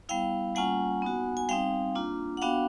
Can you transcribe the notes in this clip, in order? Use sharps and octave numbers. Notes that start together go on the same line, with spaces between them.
G3 B3 E4 F5 G5
G3 A#3 C#4 F4 F#5 G#5
B3 D#4 F#4
G#5
G3 C4 D#4 F5 G5
A#3 D4 F4
F#5
B3 D4 F#4 F5 G5